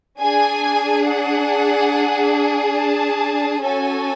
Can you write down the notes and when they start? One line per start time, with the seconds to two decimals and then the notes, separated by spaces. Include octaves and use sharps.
0.20 D4 G#4 G#5
1.06 F#5
2.76 A5
3.61 C#4 F#4 A4 G#5